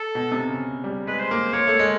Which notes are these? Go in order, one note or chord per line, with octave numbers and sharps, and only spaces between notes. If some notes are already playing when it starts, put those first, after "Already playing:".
Already playing: A4
B2
C3
C#3
G3
G#3 B4
C5
A#3
A#3 C#5
A3
G#3